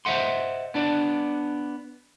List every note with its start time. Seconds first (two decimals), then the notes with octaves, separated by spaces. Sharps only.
0.05 C5 D#5 E5 F#5 C6
0.74 B3 D4 D5